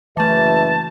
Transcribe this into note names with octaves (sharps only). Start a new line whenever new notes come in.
F#1 E3 A3 B4 E5 A5